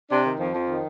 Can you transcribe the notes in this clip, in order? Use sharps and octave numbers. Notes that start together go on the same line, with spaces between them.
C3 D4
D#3
F2 F3
F2
D#3